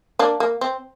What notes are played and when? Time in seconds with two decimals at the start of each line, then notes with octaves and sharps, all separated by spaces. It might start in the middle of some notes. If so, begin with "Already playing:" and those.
0.19 A#3 D4
0.40 A#3
0.61 C4